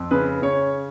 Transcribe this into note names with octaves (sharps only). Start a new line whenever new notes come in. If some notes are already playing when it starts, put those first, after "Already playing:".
Already playing: F2
C#3 B4
C#3 C#5